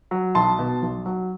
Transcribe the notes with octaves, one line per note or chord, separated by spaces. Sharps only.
F#3
B1 A5 C6
B2
B1
F#3